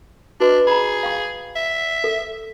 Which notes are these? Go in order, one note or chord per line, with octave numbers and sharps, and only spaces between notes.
D4 F#4 B4 D#5
G#4 A#5 B5
F5 G5 C#6
E5
A4